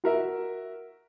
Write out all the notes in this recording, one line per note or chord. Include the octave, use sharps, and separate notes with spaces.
F#4 A#4 E5